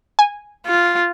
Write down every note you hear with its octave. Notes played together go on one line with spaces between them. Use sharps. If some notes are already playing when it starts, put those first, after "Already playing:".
G#5
F4